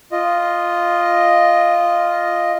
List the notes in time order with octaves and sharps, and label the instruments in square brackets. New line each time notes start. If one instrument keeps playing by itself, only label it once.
[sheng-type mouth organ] F4 D#5